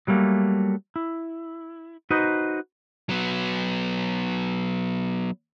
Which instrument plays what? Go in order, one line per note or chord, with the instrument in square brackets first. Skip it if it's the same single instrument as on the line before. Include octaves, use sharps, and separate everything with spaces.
[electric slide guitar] F#3 G3 A3 A#3
E4
D#4 F#4 B4 C5 D#5
[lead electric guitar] F#3 B3